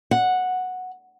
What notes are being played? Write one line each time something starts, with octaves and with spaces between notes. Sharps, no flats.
F#5